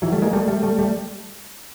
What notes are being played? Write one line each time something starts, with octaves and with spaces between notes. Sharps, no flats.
E3 F#3
G3 A3
G#3 A#3
G3 A3
G3 A3
G3 A3
G3 A3